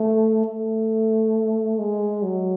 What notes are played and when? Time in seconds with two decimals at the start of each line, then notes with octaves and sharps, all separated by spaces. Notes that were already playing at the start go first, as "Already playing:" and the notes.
Already playing: A3
0.45 A3
1.78 G#3
2.24 F#3